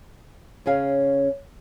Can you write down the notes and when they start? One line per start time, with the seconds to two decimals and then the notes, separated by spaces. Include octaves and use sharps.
0.66 C#3 C#4 G#4 F5